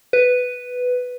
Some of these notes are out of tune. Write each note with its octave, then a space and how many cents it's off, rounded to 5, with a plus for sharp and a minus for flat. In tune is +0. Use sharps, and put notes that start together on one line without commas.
B4 +5